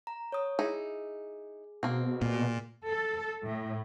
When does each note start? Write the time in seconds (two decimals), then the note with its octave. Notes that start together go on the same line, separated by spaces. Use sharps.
0.07 A#5
0.32 C#5 D#6
0.59 D#4 E4 G#4
1.83 B2 A#3 C4
2.22 A#2
2.85 A4
3.46 A2